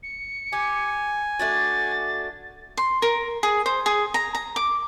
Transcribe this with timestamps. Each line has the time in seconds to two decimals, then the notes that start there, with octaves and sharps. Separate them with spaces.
0.03 C#7
0.53 G4 G#5
1.39 A3 D4 F#4 A6
2.77 C6
3.02 A#4
3.43 G#4
3.66 C5
3.86 G#4
4.14 A#5
4.35 A#5
4.56 D6